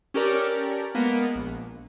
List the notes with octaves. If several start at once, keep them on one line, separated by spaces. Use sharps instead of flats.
C#4 G4 A4 A#4 D5
G#3 A#3 B3
A#1